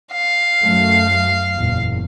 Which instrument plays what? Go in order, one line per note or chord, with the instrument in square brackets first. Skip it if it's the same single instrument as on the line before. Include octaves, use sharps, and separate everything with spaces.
[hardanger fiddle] F5
[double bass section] F#2 F#3 A3
F#1 E2 A#2